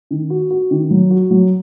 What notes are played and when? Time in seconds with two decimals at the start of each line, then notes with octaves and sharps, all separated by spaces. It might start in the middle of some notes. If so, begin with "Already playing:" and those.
0.11 D#3
0.30 F#4
0.50 F#4
0.71 D#3
0.91 F#3
1.11 F#4
1.31 F#3